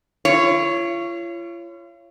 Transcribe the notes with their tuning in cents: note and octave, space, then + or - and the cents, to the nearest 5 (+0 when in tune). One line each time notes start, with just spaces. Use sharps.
F4 -40 C#5 +0